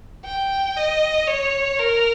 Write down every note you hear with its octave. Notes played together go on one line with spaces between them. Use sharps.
G5
D#5
C#5
A#4